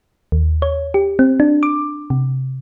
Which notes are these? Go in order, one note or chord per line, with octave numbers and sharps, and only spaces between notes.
D#2
C#5
G4
C4
D4
D6
C3